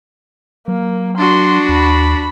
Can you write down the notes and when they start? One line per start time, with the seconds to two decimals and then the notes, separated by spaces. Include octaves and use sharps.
0.68 F#3 A#3
1.18 D4 F#4 C6
1.69 D#2 B5